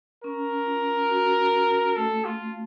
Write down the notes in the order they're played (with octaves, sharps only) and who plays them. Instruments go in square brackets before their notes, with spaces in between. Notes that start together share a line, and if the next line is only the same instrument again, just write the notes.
[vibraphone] C#4 [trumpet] A#4
[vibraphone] F4
F#4
[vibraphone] A3 [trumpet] A4
[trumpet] F4